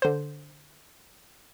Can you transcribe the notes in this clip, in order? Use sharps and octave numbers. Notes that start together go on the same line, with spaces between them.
D3 C5